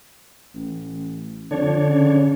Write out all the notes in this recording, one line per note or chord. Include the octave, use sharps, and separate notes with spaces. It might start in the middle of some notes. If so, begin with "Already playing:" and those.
A1
F2 D3 D4 C#5
C#3